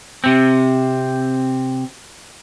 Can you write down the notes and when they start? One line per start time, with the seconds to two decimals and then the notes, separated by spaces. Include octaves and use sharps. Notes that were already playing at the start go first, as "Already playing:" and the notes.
0.24 C3 C4